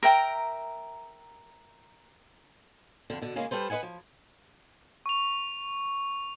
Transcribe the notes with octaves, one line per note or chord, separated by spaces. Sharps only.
A#4 E5 G5 A#5
F2 D3
B2 D3
C#3 G#3 A#3 C#4 G#4
G3 A4 B4 C5
B4 C5 D#5 F#5 G#5
F3
C#6 F7